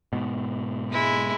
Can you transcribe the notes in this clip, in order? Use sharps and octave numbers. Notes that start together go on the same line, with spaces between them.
G#2 B2
G#3 E4